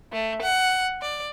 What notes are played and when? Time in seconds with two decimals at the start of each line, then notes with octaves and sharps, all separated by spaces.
0.12 A3
0.41 F#5
1.01 D5